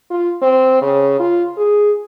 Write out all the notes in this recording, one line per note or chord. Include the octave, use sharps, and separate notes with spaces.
F4
C4
C#3
F4
G#4